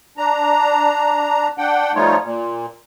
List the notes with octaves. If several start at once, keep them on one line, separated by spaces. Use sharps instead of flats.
D4 A#5
D4 F#5 G5
F3 G3 A3 D#4 F4 C#5
A#2